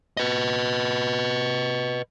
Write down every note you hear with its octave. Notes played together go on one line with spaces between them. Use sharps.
B4 D#5